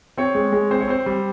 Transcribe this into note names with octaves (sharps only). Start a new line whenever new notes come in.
C4 C#5
G#3
G#3
C4 C5
C#5
C4 C5
G3